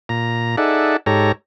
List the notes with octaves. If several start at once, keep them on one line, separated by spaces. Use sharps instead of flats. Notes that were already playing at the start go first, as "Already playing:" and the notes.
A#2 A#5
D#4 G#4 A4 D5 E5 F#5
G#2 G4 A4 C#5 A#5